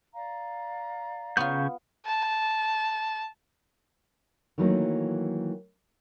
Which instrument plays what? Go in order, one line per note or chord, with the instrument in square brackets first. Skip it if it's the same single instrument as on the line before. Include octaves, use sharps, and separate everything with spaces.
[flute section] D5 F5 A#5
[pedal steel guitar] C#3 C#6 G6 [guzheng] B3 F4
[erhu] A5
[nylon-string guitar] D#3 E3 F#3 A3 A#3 D#4